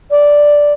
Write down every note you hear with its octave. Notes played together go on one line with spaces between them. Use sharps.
D5